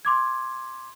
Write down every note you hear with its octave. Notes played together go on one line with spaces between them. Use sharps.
C6 D6 G#6